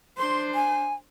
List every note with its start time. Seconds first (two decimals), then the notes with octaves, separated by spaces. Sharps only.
0.18 D4 C5 C6
0.55 G#5